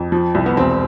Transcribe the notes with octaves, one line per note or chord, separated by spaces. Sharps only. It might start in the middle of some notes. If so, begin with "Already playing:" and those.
Already playing: F2
F3
C2
B3
E1 C4